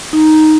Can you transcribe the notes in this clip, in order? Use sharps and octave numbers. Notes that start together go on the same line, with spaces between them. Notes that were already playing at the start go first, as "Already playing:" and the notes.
D#4